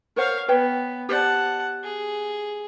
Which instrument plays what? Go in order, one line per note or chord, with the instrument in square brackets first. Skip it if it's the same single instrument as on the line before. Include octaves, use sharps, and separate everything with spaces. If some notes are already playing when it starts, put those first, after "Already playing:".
[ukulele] A#4 C5 F#5 [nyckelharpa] C#5 F5
[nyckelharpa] B3 [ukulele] B4 C#5 G5
[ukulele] G4 C5 D5 [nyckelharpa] F#5 A5
[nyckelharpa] G#4